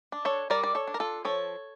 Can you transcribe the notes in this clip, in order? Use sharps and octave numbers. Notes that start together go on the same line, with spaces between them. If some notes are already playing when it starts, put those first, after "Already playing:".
D4
A4 C#5
G3 A#4 D5
D5
A4 C#5
D4
A#4
F4 A4
F3 A4 C#5